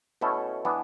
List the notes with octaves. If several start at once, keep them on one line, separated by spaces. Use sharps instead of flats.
B2 A3 C#4 E4 A4
E3 B3 D4